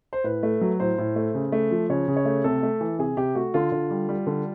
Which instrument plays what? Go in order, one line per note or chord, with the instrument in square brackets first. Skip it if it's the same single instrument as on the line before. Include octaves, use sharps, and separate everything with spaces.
[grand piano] C5
A2 B4
A3
F#3
A2 C5
A2
A3
C#3
A3
F3
C#3 C#5
C#3
C#5
A3
C3 A4
A3
E3
C3 G#4
C3 G4
A3 F#4
D3 F4
D3
G3
G3
D3